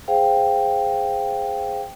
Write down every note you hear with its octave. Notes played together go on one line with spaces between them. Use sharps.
G#4 C5 F5 G5